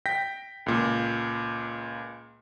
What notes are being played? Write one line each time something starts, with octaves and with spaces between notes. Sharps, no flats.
G5 G6 A#6 B6
C#2 A#2